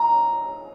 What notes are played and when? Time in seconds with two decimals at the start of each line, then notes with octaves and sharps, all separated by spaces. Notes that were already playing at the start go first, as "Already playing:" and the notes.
Already playing: A#5